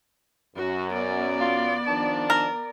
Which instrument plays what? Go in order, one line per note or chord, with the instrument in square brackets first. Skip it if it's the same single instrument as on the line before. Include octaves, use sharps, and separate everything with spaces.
[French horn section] F#2 [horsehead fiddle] F#4
[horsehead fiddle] B3 D5
[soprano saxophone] F4
[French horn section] D#3 F3 D4 [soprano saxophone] A5
[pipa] A#4